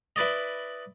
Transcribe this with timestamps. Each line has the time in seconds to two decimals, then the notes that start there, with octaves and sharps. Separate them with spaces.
0.16 E4 B4 D5 D#5